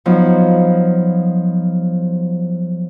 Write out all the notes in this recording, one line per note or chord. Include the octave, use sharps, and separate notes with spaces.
F3 F#3 B3 D#4